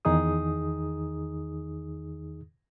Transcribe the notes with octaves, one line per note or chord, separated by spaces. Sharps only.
E2 D#3 D#4 G#4 D#6